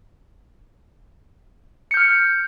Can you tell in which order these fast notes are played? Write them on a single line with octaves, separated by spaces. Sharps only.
C#7 G6 F6